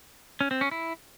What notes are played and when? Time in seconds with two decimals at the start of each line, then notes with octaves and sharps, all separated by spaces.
0.41 C#4
0.51 C4
0.61 C#4
0.71 E4